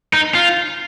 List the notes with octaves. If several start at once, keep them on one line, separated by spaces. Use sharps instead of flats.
D#4
F4